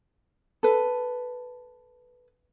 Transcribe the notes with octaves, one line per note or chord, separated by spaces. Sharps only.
A4 B4